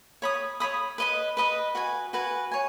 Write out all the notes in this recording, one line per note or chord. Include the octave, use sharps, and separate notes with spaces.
C#5 B5 D#6
C#5 B5 D#6
B4 D#5 B5
B4 D#5 B5
F#4 B4 G#5
F#4 B4 G#5
C#5 G#5